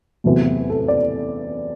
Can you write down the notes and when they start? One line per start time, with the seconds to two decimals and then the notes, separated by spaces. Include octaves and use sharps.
0.24 E2 C3 F#3 A3
0.69 A4
0.88 D5